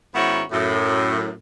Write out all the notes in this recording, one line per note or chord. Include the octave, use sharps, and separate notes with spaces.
G#2 D#3 B3 C#4 E4 F#4
F#2 A2